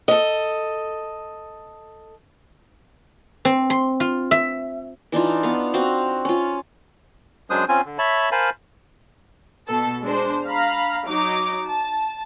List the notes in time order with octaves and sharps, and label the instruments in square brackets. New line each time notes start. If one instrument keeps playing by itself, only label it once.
[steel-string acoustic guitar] A4 D#5
[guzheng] C4
C6
F4
E5
[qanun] E3 D4 D#4 F4
B3 F5
C4 F#4 F5
C#4 F4
[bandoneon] F#2 F#3 G#3 D4 C5 D#6
C4 C#4 F4 G#5
D3
C#5 E5 A5 B5
A#4 C5 F5 G#5 A5 B5
[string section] B2 A4
G#3 D4 C5
F5 A#5 B5
F#3 D#4 D6
A5